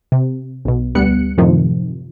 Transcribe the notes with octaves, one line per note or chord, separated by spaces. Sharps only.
C3
B1 B2
D2 G3 B3 F#6 C#7
F#2 A2 C3 D#3 F3